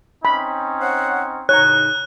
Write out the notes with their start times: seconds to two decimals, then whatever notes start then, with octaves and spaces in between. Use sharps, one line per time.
0.25 C4 C#4 D#4 B5
0.81 C5 C#5 F#5
1.49 A2 C#3 D#4 C#5 A#5 F#6